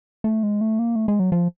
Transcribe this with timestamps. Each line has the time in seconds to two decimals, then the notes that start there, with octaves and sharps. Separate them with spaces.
0.24 A3
0.43 G#3
0.61 A3
0.79 A#3
0.96 A3
1.08 G#3
1.19 F#3
1.32 F3